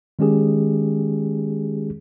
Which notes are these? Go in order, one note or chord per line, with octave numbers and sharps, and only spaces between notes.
D#3 G#3 C#4 G4 G#4